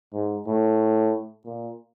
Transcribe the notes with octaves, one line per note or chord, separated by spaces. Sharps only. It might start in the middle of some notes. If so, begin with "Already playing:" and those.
G#2
A2
A#2